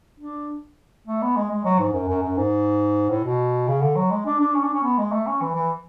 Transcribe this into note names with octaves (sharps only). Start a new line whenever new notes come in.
D4
A3
B3
G#3
G#3
F#3
G#2
F#2
F#2
F#2
G#2
A2
B2
C#3
D3
F#3
G#3
D4
D4
C#4
D4
C#4
B3
G#3
A3
C#4
E3
E3